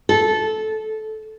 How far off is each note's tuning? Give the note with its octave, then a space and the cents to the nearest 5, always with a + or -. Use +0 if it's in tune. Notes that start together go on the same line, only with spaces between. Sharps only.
A4 -15